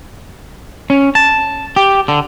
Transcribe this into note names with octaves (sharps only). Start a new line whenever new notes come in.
C#4
A5
G4
D3